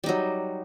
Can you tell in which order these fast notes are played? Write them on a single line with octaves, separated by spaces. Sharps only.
G3 D#4 F#3